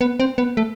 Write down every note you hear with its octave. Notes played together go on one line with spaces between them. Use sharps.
B3
C4
B3
A3